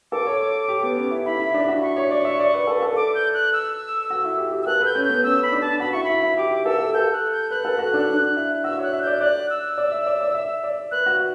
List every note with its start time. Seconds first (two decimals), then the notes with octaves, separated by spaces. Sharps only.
0.12 A4 D6
0.27 C#5
0.40 C#5
0.68 G4
0.83 B3
0.97 C#4
1.11 E4
1.26 E4 B5
1.40 E4
1.54 D4
1.68 F#4
1.76 B5
1.83 C#6
1.96 C#5
2.11 D5
2.25 E5
2.40 D5
2.54 B4
2.67 A4
2.82 A4
2.96 D6
3.15 G6
3.34 F#6
3.53 E6
4.10 F#4
4.24 E4
4.38 G4
4.52 G4
4.62 E6
4.67 A4 F#6
4.80 B4
4.85 G6
4.95 C#4
5.05 B3 G6
5.24 C#4 E6
5.43 B5
5.52 D4
5.61 A5
5.80 F#4 B5
5.92 E4 C#6
6.04 B5
6.09 E4
6.22 E4
6.37 G4 D6
6.65 A4 E6
6.94 A4 G6
7.13 F#6
7.32 G6
7.51 B4 F#6
7.65 A4
7.79 F#4
7.94 D4
8.08 D4
8.36 E4
8.64 F#4 E6
8.79 C#5 F#6
8.93 E5
9.02 D5 G6
9.21 D5 F#6
9.50 E6
9.78 D5
9.92 E5
10.06 D5
10.21 D5
10.35 E5
10.64 D5
10.91 B4 F#6
11.06 F#4